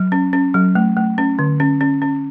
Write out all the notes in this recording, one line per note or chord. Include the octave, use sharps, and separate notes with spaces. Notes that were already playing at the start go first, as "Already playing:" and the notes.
Already playing: F#3
C#4
C#4
F#3
A3
A3
C#4
D3
C#4
C#4
C#4